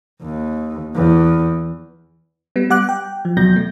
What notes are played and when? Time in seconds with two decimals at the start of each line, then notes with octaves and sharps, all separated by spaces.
0.22 D#2
0.95 E2
2.56 G3 B3
2.70 G3 F#5 D6 F#6
2.89 G5
3.25 F3
3.37 D#2 B2 F#3 G6 A#6
3.56 A3